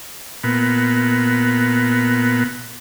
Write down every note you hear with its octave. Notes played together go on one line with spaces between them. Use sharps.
A#2 B3